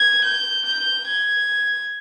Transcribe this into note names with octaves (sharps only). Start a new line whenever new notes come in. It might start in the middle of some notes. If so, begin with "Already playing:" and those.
Already playing: G#6
G6
G6
G#6